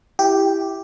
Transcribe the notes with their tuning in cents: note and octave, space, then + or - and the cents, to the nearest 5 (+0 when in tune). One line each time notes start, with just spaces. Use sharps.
E4 +0 G4 +0